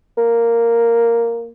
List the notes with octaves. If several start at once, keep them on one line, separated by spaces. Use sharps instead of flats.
A#3